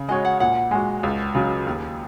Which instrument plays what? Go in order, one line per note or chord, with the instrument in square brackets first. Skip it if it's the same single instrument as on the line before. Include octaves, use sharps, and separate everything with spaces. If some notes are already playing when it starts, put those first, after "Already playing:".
Already playing: [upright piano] C#3
[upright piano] G#3 F#4 C#5 [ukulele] D#5
[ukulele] F#5
[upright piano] A#2 [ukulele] F#5
[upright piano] G#3 F#4
C#2
C#3 F#3
D#2